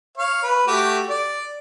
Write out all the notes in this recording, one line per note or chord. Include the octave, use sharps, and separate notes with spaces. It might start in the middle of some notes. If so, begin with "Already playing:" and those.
C#5 F5
B4
A3 F#4 G4
D5